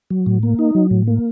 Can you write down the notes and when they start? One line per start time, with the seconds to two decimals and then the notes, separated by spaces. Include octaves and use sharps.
0.10 F#3
0.26 A2
0.43 A#3
0.59 D#4
0.75 F#3
0.91 A2
1.07 A#3